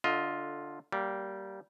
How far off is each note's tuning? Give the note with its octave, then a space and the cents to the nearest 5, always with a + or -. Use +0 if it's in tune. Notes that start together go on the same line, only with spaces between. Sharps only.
D3 +0 F4 +5 D#5 +30
G3 -15 A#3 +0